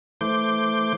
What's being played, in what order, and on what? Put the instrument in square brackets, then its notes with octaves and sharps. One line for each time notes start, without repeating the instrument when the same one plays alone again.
[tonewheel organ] E3 A3 C5 D6 G6